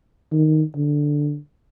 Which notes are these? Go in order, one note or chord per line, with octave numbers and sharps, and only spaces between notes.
D#3
D3